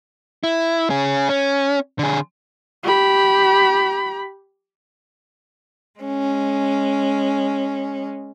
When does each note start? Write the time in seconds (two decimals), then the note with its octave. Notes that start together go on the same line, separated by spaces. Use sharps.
0.44 E4
0.90 C#4 G#4
1.29 C#4
1.99 D3 G#4
2.83 G4 B5
5.99 G#3 C#4